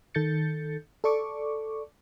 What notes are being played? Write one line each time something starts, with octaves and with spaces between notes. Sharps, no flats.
D#3 A4 G6 A6 C#7
A4 D5 C#6 D6